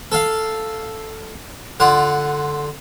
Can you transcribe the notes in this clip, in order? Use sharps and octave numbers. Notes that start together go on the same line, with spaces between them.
A4 F5
D3 F4 F#5